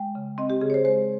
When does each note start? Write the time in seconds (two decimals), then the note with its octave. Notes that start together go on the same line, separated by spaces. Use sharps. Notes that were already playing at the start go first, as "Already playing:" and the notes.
Already playing: G#3 G5
0.15 C#3
0.38 C4 D#5
0.50 G4
0.61 C#3 G#4
0.70 C#5
0.74 C5
0.85 G#3 C5